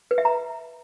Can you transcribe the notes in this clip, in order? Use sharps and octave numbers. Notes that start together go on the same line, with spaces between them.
B4
E5
A#5